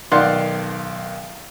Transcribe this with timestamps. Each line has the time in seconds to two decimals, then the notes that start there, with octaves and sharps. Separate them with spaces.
0.12 B1 D#3 D5 F5 F#5 C6